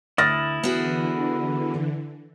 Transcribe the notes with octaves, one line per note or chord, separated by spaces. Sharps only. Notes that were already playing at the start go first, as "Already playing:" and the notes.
D2 E4 D#6 F6 A6 A#6
D3 E3 B3 F#4 G#4